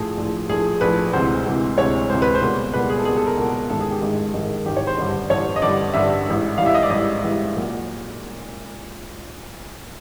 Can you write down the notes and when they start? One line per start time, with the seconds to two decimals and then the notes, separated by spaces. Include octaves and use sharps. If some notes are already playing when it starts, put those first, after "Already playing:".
Already playing: A#1 A2 F3 A3 G#4
0.17 A#1 A2 F3 A3
0.49 A#1 A2 F3 A3 G#4
0.81 A#1 A2 F3 A3 B4
1.13 D2 C3 E3 G#3 C5
1.46 D2 C3 E3 G#3
1.78 D2 C3 E3 G#3 C#5
2.09 D2 C3 E3 G#3 C5
2.22 B4
2.35 C5
2.42 C#2 B2 G3 A#3
2.73 C#2 B2 G3 A#3 B4
2.90 G#4
2.98 A4
3.05 C#2 B2 G3 A#3 G#4
3.16 A4
3.27 A#4
3.37 C#2 B2 G3 A#3 A4
3.70 A1 G#2 D#3 G#3 A4
3.80 G#4
3.91 G4
4.02 A1 G#2 D#3 G#3
4.34 A1 G#2 D#3 G#3
4.66 A1 G#2 D#3 G#3 G4
4.77 C#5
4.87 C5
4.98 A1 G2 D3 G3
5.30 A1 G2 D3 G3 C#5
5.56 D#5
5.62 A1 G2 D3 G3 D5
5.94 A1 G2 D3 G3 E5
6.26 A1 G#2 E3 G3
6.58 A1 G#2 E3 G3 F5
6.66 E5
6.74 D#5
6.83 D5
6.90 A1 G#2 E3 G3 D#5
7.22 A1 G#2 E3 G3
7.56 A#2 F#3 A#3